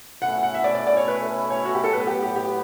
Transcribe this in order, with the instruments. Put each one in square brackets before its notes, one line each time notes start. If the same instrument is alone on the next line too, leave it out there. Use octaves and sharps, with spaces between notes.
[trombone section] B2 A3 C#4 E4 [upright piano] F#5
[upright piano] F#5
E5
D5
D5
D5
C#5
B4
C#5
F#4
G4
A4
[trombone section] A2 F#3 B3 [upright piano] B4
[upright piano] G4
G4
G4